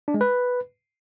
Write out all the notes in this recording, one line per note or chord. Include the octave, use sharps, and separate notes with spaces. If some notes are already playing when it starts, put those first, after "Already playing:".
D4
G#3
B4